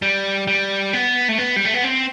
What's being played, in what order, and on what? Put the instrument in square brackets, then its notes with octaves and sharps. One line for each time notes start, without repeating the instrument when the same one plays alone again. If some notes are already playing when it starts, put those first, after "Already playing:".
[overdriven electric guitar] G3
G3
B3
A3
B3
G3
A3
B3
C4